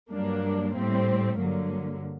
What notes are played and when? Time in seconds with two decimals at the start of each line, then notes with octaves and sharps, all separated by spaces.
0.11 G2 F#3 A#3 D4
0.75 A2 G3 C4
1.37 G2 D3 F#3 A#3